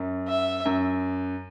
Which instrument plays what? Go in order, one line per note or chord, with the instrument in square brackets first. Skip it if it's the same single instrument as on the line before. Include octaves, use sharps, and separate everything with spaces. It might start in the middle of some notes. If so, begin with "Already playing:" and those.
Already playing: [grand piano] F#2
[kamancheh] E5
[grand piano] F#2